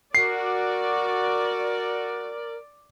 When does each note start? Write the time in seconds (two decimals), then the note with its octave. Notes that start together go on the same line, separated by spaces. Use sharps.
0.15 F#4 A#4 D5 C7